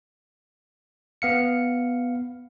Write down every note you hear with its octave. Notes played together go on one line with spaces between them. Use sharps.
B3 F5 C#7